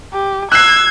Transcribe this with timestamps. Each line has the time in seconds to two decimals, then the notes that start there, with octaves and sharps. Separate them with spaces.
0.13 G4
0.52 E6 F#6 G#6 C7